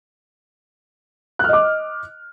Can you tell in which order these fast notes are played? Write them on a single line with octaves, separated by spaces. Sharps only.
F#6 F6 D#5 D6